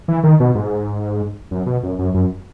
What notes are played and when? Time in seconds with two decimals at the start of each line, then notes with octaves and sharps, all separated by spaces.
0.08 E3
0.23 D#3
0.40 B2
0.55 G#2
1.51 F#2
1.66 B2
1.83 F#2
1.99 F#2
2.14 F#2